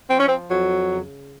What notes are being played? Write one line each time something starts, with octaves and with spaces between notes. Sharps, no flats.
F3 C4
C#4
C4
F2 F#3
C#3